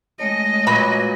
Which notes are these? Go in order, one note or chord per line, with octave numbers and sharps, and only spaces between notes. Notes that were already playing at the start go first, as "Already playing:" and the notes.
G#3 A3 C#5 D#5
A#2 F#3 B4 B5